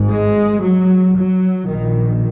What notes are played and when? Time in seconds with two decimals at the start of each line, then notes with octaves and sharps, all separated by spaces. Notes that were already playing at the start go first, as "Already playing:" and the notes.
Already playing: G#1 G#2
0.09 G#3
0.62 F#3
1.16 F#3
1.68 A#1 A#2 D#3